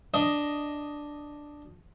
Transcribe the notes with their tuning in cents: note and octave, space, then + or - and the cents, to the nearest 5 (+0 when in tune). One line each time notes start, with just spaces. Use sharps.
D4 +0 D#5 +0